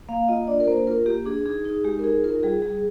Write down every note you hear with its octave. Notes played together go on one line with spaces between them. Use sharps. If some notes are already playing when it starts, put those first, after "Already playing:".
A#3 F5
F4 D#5
D4 D5
A#4
A#3 C5
F4 A#4
A#3 G4
D4 G#4
D#4 G#4
D#4 G#4
G#3 G4
A#4
D#4 G#4
F4 A#4
G3 G#4
G3 G#4